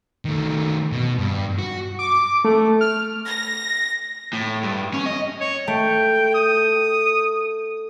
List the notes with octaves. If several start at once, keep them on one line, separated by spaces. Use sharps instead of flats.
D#3 A3
B2
G2
F#4
D6
A3
F6
A#6
A2
G2
C#4
D#5
C#5
A3 G5
D#6